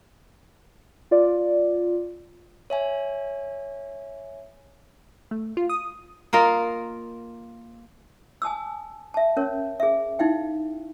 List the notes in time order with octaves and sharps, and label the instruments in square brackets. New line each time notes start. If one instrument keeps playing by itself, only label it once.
[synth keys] F4 D5
[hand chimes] C#5 E5 G#5
[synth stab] A3
F4
D#6
[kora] A#3 F4 A#4 D#5
[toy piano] G#5 A5 D#6 E6
E5 A5
C#4 A#4 C#5
G#4 E5
D#4 E4 F5 G5